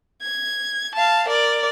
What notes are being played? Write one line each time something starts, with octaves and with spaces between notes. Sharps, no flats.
G#6
F5 A5
A#4 D5